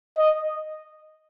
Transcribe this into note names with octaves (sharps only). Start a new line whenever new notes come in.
D#5